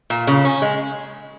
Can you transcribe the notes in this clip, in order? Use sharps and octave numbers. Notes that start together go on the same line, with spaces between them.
A#2
C#3
C#4
G#3